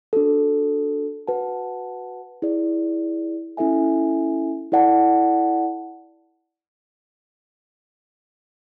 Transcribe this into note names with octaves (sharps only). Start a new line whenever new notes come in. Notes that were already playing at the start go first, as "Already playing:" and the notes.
D4 F#4 A4
F#4 B4 F#5 A5
E4 G#4 D5
C#4 E4 A4 E5 G#5
E4 A4 D5 F#5 A5